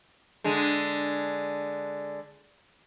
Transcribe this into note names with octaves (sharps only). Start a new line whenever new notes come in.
D3 G#3